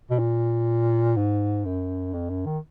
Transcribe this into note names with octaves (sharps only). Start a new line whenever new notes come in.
B2
A#2
G#2
F#2
F2
F#2
D#3